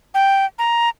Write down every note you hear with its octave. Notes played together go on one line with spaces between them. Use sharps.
G5
A#5